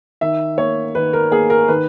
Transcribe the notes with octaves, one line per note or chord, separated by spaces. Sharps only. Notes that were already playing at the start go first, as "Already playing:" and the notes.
D#3 E5
A#3 C#5
D#3 B4
A#4
A#3 G#4
A#4
D#3 B4